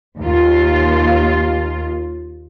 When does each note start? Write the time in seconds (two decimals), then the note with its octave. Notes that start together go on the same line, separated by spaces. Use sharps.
0.19 D#2 F4